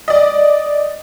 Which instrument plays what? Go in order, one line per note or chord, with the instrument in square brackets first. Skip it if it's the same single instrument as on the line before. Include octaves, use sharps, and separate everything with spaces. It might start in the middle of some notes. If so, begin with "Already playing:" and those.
[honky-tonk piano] D5 D#5